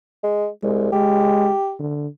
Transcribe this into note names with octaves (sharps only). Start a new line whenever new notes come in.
G#3
C2 G#3
G#3 G4
D3